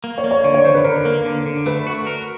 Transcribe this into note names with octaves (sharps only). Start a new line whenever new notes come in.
A#3
C#5
A#3
C#5
D3 D5
C#5
D3 C5
B4
D3 A#4
A#3
D3
D3
A3 B4
F#4
A#4